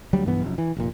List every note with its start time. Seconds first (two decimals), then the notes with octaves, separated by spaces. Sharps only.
0.13 D2 F#3 G3
0.25 B1 G2 E3 B3
0.42 F1 F#2
0.58 E3
0.77 F1 A#2